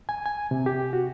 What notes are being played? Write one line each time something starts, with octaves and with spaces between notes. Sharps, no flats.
G#5
G#5
C3
G4
F#4